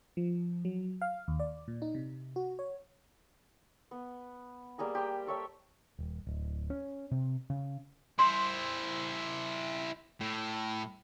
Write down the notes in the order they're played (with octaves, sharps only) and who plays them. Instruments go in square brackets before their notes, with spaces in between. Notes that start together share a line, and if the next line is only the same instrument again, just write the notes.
[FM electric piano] F3
F#3
F5
D#2
D5
A#2
D#4
C3
F#4
C#5
[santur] B3
G3 A#3 G#4 A#5
G4 C5 G5
A4 C#5 E5 G5
[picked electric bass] D#1
D1
C#4
C3
C#3
[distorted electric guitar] E4 C5 [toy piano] C6
[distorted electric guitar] A2